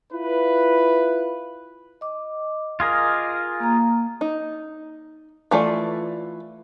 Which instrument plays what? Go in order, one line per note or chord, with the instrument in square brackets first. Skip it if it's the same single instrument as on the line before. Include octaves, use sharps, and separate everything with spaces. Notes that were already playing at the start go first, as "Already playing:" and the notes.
[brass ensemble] E4 F4 B4
[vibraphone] D#5 D6
[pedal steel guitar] F4 G#4 A#4
[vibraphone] A#3 A#5
[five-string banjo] D#4
E3 A3 F4 D5